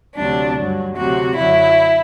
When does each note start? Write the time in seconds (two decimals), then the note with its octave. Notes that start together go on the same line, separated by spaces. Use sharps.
0.16 D2 C3 F#3 D4
0.57 G2 F#3
0.96 D2 C3 F#3 F#4
1.36 F#2 D3 F#3 E4